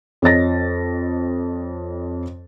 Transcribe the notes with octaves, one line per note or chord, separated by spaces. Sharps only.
F2 C#5 D#5 A6 A#6